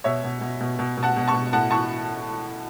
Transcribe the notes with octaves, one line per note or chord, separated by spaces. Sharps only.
B2 C#5 E5
B2
B2
B2
B2
B2
F#5 A5
B2
A5 C#6
B2
A2 F#5 A5
E3 A5 C#6